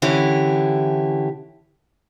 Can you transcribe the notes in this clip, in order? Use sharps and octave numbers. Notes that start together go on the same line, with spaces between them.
D3 E3 C#4 E4 G4